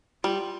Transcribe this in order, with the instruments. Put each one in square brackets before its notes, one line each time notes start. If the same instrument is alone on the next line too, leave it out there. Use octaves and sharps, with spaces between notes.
[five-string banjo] G3 [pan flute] F4